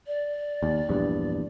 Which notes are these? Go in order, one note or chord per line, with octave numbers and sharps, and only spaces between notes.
D5
D#2
A#1 E2 G2